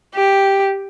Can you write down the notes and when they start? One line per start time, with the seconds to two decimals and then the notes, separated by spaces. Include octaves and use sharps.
0.15 G4